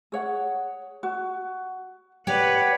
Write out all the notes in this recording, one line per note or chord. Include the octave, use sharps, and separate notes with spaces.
G#4 C#5 F#5
F#4
G4 B4 C#5 D5 F#5